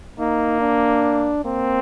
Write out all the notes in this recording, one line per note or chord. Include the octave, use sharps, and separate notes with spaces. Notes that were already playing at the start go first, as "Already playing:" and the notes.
A#3 D#4
D4
A#3 C4